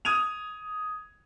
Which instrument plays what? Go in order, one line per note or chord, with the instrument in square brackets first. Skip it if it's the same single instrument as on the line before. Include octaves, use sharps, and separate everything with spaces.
[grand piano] D#6 G#6 D#7 F7